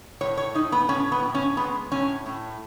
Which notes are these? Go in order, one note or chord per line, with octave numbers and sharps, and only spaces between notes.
A2 C#5
C#5
A2 D#4
B3
A2 C#4
B3
A2
C#4
G#3 B3
A2 C#4
A2